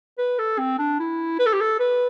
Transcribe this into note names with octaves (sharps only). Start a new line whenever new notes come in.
B4
A4
C4
D4
E4
B4
A4
G4
A4
B4